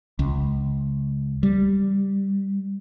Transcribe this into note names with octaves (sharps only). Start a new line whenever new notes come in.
C#2
G3